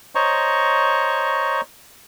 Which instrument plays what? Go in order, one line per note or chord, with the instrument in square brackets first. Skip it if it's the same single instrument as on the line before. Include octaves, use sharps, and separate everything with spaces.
[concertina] C5 C#5 D#5 A#5 C#6